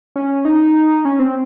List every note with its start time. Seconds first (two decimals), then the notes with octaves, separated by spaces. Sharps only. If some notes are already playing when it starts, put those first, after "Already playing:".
0.16 C#4
0.45 D#4
1.05 C#4
1.19 C4